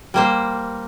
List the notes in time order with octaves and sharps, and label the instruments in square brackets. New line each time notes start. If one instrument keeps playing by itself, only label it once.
[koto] G3 A#3 C5